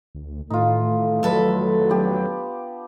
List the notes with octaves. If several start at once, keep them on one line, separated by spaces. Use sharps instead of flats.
D2
A2 D#3 E3 A3 D#4 F4
F2 F#3 A4 B4
B3 D4 G4